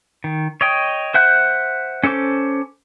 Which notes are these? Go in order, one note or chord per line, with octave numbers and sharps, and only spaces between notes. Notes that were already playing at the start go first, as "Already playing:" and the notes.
D#3
C#5 D#5 G5
C5 E5 F#5 F#6 G6
C#4 A4 C5 D6